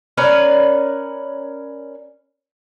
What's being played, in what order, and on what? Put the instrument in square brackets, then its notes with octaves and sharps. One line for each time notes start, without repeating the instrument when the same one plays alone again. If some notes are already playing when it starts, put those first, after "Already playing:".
[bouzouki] C#4 A#4 B4 D5